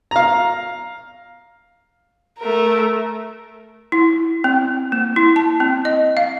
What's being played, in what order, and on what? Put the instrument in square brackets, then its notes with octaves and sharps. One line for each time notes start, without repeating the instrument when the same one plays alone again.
[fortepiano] F5 A#5
[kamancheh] A3 A#4
[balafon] E4
C4
A#3
E4
A5
C4
D#5
F5